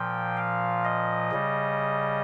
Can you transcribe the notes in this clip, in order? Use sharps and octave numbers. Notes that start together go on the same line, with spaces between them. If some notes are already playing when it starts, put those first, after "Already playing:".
Already playing: A#2 F3 G5
F5
D#5
C#3 G3